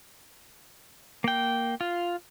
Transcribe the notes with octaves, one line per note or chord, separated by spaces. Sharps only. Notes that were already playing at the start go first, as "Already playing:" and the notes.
A#3 G5
F4